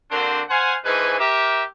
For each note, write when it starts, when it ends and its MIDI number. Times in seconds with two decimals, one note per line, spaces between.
0.11 0.42 50
0.11 0.42 58
0.11 0.42 60
0.11 0.42 62
0.11 0.42 66
0.11 0.42 72
0.49 0.75 72
0.49 0.75 77
0.49 0.75 78
0.49 0.75 80
0.85 1.15 44
0.85 1.15 52
0.85 1.15 53
0.85 1.15 71
0.85 1.15 80
1.19 1.63 67
1.19 1.63 70
1.19 1.63 76